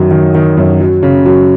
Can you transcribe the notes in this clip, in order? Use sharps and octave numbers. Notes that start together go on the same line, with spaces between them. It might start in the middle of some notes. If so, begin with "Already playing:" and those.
Already playing: F#2 D#3 F#3
D#3
D#3
F#2
F#3
C#3
F#3